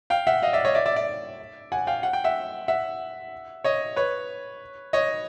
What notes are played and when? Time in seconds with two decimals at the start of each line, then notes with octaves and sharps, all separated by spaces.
0.10 F5 G5
0.27 E5 F#5
0.42 D#5 F5
0.53 D5 E5
0.65 C#5 D#5
0.75 D5 E5
0.86 D5 E5
0.96 D5 E5
1.72 F#5 G#5
1.87 F5 G5
2.03 F#5
2.13 G5
2.24 E5 F#5
2.68 E5 F#5
3.64 C#5 D#5
3.96 B4 C#5
4.93 C#5 D#5